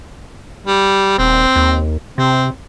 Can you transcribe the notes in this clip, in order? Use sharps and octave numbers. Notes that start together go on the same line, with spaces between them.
G3
D#1 C4
D#2
C3 C4